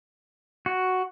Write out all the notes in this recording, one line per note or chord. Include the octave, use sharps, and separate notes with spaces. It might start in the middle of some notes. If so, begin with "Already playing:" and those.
F#4